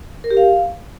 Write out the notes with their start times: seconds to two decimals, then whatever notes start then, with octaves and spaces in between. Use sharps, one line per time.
0.24 A#4
0.31 G4
0.37 F5